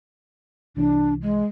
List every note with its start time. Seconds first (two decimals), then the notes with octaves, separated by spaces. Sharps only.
0.77 C2 E3 D4
1.22 G#3